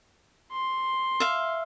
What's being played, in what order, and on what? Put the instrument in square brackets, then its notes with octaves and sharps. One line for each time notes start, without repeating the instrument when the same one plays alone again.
[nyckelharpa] C6
[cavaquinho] E5 F5